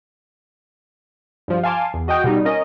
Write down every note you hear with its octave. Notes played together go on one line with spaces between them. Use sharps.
G2 F3
F5 G#5 A5 C6 D6
E2
F#4 D#5 F#5 G5
B2 G3 D#4
C#4 A#4 D#5